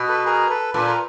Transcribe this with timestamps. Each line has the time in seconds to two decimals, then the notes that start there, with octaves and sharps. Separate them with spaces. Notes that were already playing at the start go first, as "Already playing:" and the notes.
Already playing: B2
0.09 A4 B4
0.25 G#4 A#4
0.50 A4 B4
0.74 A#2 A4 B4
0.87 A#4